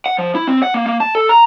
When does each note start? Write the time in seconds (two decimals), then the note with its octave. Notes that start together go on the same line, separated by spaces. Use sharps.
0.06 F#5
0.18 F3
0.35 E4
0.47 C4
0.62 F#5
0.74 A#3
0.86 A#3
1.00 A5
1.15 A4
1.29 A#5